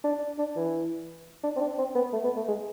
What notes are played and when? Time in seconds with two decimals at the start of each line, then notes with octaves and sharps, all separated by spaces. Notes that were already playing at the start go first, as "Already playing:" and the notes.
0.04 D4
0.38 D4
0.56 E3
1.43 D4
1.56 C4
1.61 D4
1.78 C4
1.95 B3
2.13 A3
2.24 B3
2.36 A3
2.48 G#3